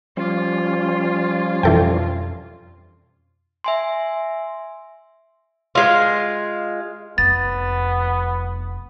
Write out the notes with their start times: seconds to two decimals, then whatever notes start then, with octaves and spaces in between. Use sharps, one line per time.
0.17 F3 G3 C#4 F4
1.63 F2 B2 E3 D4 A4 G5
3.64 E5 G#5 C6
5.75 G#3 F4
7.18 F1 F2 B3 A6